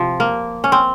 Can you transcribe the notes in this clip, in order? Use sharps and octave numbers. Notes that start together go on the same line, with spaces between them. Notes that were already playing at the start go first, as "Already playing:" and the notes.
Already playing: C3 F3
A#3
C#4
C4